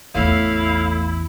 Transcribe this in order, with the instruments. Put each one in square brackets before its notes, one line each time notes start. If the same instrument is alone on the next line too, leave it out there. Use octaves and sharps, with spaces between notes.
[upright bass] A1 E2 [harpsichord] A2 [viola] E4 [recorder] F5